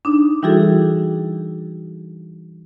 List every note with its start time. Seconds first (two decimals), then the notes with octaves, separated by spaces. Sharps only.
0.05 D4 D#4
0.43 E3 G3 E4 F#4 G#4 A4